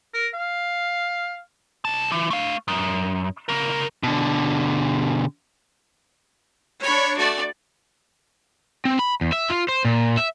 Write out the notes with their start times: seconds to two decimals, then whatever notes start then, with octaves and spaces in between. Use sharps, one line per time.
0.14 A#4
0.34 F5
1.85 B1 A5
2.12 E3
2.30 A3 F5
2.68 F#2
3.49 C#3 A#4
4.03 B2 D3
6.83 D4 C#5 B5 C#6
7.17 A3 F#4 D5
8.85 C4
8.99 B5
9.21 E2
9.32 E5
9.50 F4
9.68 C5
9.85 A#2
10.17 E5